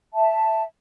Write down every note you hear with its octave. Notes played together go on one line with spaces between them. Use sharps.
E5 A5